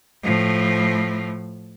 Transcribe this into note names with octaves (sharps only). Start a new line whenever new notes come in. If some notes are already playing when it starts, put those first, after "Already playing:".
A2 F3